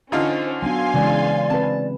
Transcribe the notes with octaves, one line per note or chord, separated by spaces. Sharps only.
D3 C#4 D#4 F4 C5
F#3 B3 D4 F5 G#5 C6
C#3 E3 G#3 D5
C4 B4 A5